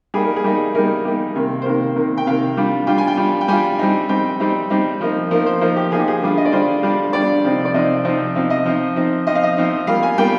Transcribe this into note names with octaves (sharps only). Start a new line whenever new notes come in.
G3 A#3 D#4 G#4
A#4
G#4
G3 A#3 D#4
G3 A#3 D#4 A#4
G3 A#3 D#4
C3 D#3 A#3
C5
C3 D#3 A#3 A#4
C3 D#3 A#3
G5
C3 D#3 A#3 F5
G3 D4 F4
G3 D4 F4 G5
G#5
G5
G3 D4 F4
G5
G3 D4 F4 G#5
G3 C4 D#4
G3 C4 D#4 G5
G3 C4 D#4
G3 C4 D#4
F3 A#3 D#4
F3 A#3 D#4 A#4
C5
F3 A#3 D#4 C5
G4
F3 A#3 D#4 G#4
G4
G#4
D3 G3 D4 F4
D#5
D5
D3 G3 D4 F4 C5
D3 G3 D4 F4
D3 G3 D4 F4 D5
C3 F3 C4 D#4
D5
C3 F3 C4 D#4 D#5
C3 F3 C4 D#4
C3 F3 C4 D#4
D#5
F3 C4 D#4
F3 C4 D#4
F3 C4 D#4 D#5
F5
D#5
F3 C4 D#4
G3 A#3 F4 F5
G#5
G3 A#3 F4 G5